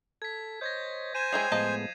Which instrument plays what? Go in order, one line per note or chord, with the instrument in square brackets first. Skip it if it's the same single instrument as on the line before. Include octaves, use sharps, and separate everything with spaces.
[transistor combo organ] A4 [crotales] G#6 B6
[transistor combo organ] C5 C#5 D#5 [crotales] G6 G#6 A#6
[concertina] C5 G#5 [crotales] D#7 E7
[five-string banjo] G#3 E4 G#4 [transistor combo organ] C#5 G5 [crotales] G#6 C7 F7
[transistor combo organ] A2 G#3 B3 [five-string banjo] F3 D#5 A5